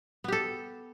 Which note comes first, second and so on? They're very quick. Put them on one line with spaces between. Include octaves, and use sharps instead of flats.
B3 G4 A4